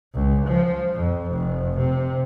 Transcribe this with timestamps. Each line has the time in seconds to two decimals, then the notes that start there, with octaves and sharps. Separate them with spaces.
0.15 C#2
0.47 F3
0.94 F2
1.31 F1
1.78 C3